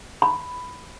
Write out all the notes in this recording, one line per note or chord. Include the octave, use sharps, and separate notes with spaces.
B5